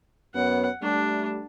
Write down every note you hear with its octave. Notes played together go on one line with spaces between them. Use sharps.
F#2 B3 C#5 F#5
G3 A3 D4